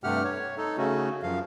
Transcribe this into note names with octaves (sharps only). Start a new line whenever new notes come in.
G2 C3 A3 G4 F#5 F6
C#5
D#4 A4
C#3 A3 C#4 F#4
F#2 F3 F5